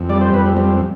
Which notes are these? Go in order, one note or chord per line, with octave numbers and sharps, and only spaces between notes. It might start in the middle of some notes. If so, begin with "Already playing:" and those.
Already playing: F2
G3 D5
C5
F2 B4
C4
G3 C4